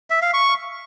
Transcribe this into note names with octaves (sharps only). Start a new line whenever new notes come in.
E5
F5
C#6